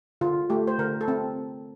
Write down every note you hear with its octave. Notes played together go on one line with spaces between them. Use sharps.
D3 F4
A3 G4
C5
D3 A#4
A4
C4